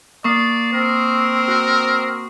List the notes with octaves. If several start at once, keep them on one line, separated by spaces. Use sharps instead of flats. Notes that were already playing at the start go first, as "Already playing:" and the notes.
A#3 D5 C#6 D#6 C7
C4 A#4
F#4